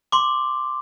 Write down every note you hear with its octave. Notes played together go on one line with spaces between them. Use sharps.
C6 D6